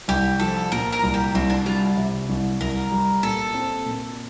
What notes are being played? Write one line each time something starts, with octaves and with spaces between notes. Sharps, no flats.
C2 G4
F3 A4
A#2 A#4
A#4
C2
G4
C2 C4
D4
G3 F4
C3
C2
C2 A#4
G3
A#2 A4
C4
A#2